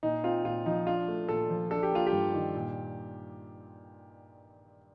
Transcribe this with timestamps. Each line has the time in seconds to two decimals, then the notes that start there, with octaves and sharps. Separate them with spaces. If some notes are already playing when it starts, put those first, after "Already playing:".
0.03 A#2 D#4
0.24 C4 F4
0.45 A#2 F4
0.66 F3 D#4
0.87 D4 F4
1.08 A3
1.29 A#2 A4
1.50 F3
1.71 D4 A4
1.83 G4
1.91 A#3 F4
2.07 G4
2.12 G2
2.34 D#3
2.55 A#2